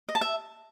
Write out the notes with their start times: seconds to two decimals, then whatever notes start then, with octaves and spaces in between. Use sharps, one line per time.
0.09 D#5
0.15 A5
0.21 E5